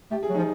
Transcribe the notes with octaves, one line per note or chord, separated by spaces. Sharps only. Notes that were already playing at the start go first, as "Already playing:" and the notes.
A3 G4
G#4
F#3
F3 D#4